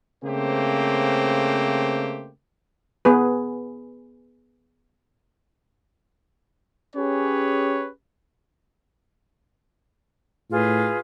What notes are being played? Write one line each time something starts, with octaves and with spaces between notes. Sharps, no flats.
C#3 A3 A#3 C4 G4 C5
B3 G#4 B4
C#4 G4 G#4 B4 C#5
A2 F4 G#4 B4